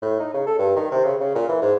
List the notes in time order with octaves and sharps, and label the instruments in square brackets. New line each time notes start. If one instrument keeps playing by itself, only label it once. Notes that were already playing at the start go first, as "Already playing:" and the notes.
[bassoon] A2
D#4
C#3
A4
G2
D#3
C3
C#3
C#3
A#2
E3
G#2